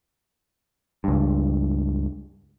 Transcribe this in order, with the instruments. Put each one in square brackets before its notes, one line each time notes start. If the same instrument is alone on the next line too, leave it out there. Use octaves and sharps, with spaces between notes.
[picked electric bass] C#2 G2